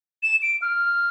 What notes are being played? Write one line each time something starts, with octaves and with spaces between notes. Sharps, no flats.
E7
D7
F6